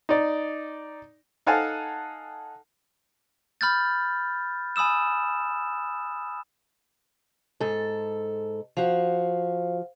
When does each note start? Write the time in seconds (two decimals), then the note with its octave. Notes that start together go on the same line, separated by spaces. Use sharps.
0.09 D#4 D5
1.46 D#4 A4 F5 F#5 G#5 A5
3.61 B5 F6 G6 A6
4.76 G#5 B5 D#6 E6 E7
7.60 G#2 A4
8.77 F3 F#4 C5 F5